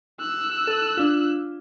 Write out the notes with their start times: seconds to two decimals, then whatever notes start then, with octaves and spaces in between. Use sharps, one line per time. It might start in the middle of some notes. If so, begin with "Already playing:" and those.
0.20 E6 F#6
0.67 A4
0.97 D4 F4